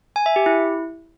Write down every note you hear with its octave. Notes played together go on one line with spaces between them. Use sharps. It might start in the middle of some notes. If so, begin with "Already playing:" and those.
G#5
E5
G4
E4